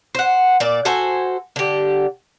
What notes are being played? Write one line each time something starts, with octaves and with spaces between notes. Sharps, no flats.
C5 F#5
A#2 D5
F#4 A4 C5 G#5
D3 G4